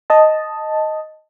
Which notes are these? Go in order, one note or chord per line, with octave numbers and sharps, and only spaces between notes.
D#5 A5